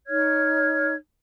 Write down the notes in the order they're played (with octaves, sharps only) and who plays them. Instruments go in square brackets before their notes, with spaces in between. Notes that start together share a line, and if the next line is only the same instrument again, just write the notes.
[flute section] D#4 C#5 F6 G#6